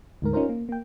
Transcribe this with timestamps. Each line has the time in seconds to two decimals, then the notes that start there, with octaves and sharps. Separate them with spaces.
0.22 D2 G#2 A#4
0.33 C#4 D#4 F4 A#4 C5
0.49 A#3
0.69 A#3 G5